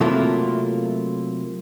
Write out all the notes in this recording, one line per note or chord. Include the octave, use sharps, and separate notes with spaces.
C3 F#3 A3 A#3 E4 F4